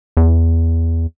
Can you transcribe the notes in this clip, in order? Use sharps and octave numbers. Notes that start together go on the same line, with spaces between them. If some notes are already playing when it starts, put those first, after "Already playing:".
E2